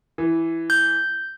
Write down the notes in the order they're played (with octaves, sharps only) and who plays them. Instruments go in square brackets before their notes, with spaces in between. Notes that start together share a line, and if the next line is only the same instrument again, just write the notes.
[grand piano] E3
[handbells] G6